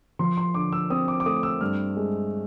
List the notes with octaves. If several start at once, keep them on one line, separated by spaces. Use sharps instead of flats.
F3 C6
C6
D3 D6
E6
C4 D#6
D6
D6
A3 D#6
E6
G2 F6
G#3